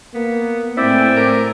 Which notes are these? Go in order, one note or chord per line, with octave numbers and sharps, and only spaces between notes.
A#3 B3
A2 A3 C4 E4 D5 E5 G5 G#5
A#4